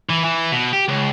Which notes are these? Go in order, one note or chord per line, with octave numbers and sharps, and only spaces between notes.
E3
E3
B2
G4
C#2